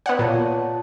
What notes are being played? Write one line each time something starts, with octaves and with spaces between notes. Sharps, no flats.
B3 D5 F#5
A#2 F4 C#5 A5